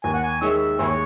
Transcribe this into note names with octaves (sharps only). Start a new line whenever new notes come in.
D#2 G#5
F#5
G#5
D#3 G#3 C#5 E5
D#2 E4 G#4 C#5